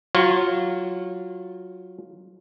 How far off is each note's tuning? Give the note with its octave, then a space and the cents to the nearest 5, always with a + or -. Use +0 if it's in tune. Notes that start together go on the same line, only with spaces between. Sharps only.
F#3 +0 F4 +0 C#5 -30